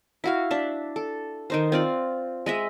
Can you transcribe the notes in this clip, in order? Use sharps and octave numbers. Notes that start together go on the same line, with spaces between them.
E4 F#4 F5
D4 E5
A4
D#3 D#4 C5
C4 F4 D5
G#3 D#5 E5